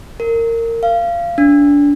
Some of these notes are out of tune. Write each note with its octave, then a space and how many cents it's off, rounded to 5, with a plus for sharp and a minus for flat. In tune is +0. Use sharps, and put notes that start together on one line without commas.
A#4 -25
F5 -25
D4 -25